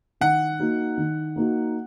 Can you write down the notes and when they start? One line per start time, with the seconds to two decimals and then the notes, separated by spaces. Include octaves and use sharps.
0.21 D#3 F#5
0.59 A#3 D#4 F#4
0.98 D#3
1.36 A#3 D#4 F#4